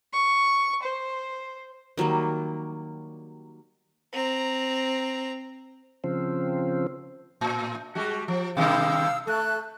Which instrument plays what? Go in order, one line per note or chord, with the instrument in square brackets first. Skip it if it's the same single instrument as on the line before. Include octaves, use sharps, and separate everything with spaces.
[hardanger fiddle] C#6
C5
[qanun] D#3 F#3 G3 A#3
[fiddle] C4 A#5
[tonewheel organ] C#3 F3 C4
[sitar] A2
G3 G#3 F#4
F3
[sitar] B2 D#3 G3 [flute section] F5 D#6 E6
[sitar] A3 [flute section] A4 F#6